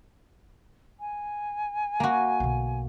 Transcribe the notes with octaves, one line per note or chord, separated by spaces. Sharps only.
G#5
A#3 F#4
B1 D3